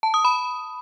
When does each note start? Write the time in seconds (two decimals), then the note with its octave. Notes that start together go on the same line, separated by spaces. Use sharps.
0.03 A5
0.14 D#6
0.25 B5